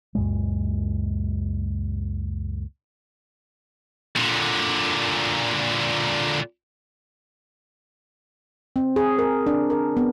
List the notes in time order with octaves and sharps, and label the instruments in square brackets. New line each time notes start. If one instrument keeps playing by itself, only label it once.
[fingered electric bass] C#2 F#2 A#2 G#3
[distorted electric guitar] A#2 D3
[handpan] C4
G#4
A#4
D4
A#4
B3